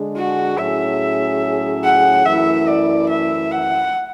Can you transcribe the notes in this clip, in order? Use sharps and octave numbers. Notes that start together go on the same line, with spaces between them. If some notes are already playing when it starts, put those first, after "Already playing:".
Already playing: D3 G#3 D4 G#4
F#4
A2 F#3 C#4 G#4 E5
F#5
F#2 E3 A3 E4 E5
D5
E5
F#5